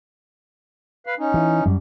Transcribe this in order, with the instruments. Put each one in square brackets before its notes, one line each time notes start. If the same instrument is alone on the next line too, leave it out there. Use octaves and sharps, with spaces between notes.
[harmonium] B4 F5
C#4 D#4
[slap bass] E3
F#2 G3